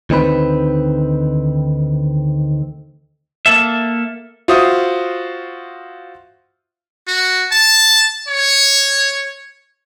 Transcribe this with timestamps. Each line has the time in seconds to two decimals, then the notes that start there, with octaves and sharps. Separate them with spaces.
0.10 D2 D#3 C4 B4
3.46 A#3 A4 E5
4.48 F4 F#4 C5 E5 D#6
7.07 F#4
7.52 A5
8.28 C#5